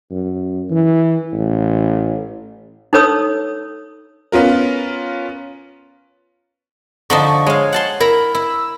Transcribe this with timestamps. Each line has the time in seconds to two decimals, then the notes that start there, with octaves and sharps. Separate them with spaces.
0.11 F#2
0.71 E3
1.33 A1
2.93 D#4 A4 B4 C#5 D#6 E6
4.32 B3 C#4 F4 A#4
7.10 D3 F3 D#4 C#6
7.46 G#3 C#5 F5
7.73 F#5 A5 C6
8.00 E4 A#4 A#5 B5
8.35 E4 E6